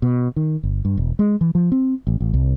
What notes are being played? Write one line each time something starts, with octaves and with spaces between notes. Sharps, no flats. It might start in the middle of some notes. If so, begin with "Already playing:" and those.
B2
D#3
G1
G2
E1
G#3
E3
F3
C4
A1
A1
C2